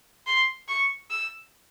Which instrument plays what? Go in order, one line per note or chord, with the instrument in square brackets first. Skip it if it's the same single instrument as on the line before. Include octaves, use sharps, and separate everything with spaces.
[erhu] C6
C#6
E6